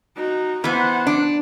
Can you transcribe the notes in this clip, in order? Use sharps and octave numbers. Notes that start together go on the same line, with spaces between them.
D#4 F#4
E3 B3 C5 F#5
D4